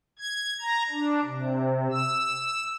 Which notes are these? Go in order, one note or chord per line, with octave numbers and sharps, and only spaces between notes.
G#6
A#5
D4
C3
E6